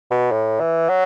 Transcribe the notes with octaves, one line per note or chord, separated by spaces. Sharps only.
B2
A2
E3
F#3